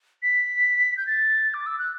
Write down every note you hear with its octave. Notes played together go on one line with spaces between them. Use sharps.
B6
G6
A6
D6
E6
F#6